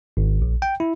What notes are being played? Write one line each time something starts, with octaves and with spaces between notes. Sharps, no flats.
G#1
A#1
G5
E4